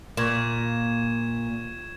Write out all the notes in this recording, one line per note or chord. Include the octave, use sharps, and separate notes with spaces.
A#2 C#6 G#6 E7